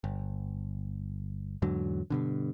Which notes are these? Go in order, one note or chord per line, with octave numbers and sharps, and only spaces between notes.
G1
E2 G#2 D3 F#3
G2 B2 D3